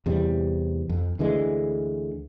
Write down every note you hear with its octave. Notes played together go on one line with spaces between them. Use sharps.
E2 C3 E3 G3
F2
D2 D3 E3 G#3